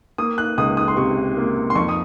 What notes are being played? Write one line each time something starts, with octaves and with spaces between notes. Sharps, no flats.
A#3 D#6
F#6
C#2 D#6
D#6
C6
C3 C#6
A#3
C6
F2 C#6
D#6